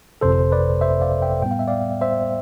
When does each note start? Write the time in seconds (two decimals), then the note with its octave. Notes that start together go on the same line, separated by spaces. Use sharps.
0.21 G1 F2 C3 A4 C5
0.52 B4 D5
0.81 C5 E5
1.02 D5 F5
1.22 E5 G5
1.42 A2 G3 B3 G5
1.51 F5
1.59 E5
1.68 D5 F5
2.01 C5 E5